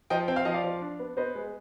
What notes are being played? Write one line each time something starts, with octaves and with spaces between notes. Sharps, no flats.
F3 D#5 G5
C4 G5
F5
F3 D#5
D5 F5
F3
D4
B3
B3 C5 D#5
G#3